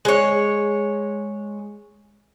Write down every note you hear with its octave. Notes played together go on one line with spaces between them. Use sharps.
G#3 C#5